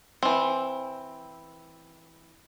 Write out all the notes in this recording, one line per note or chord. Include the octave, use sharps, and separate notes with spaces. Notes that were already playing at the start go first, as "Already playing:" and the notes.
E3 C4